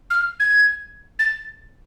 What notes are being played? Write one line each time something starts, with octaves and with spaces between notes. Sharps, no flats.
F6
G#6
A6